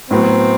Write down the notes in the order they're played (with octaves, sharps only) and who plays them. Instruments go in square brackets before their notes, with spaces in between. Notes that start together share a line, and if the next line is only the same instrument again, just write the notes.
[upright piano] A2 F#3 B3 [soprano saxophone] C4